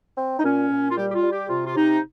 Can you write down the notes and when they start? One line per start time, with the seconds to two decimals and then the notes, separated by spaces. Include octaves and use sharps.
0.17 C4
0.39 D#4
0.44 A#2 C#4
0.70 A#2
0.90 F4
0.96 G3 G4
1.09 G4
1.14 F4
1.23 G3
1.31 G4
1.48 C3 F4
1.66 F4
1.75 C3 D#4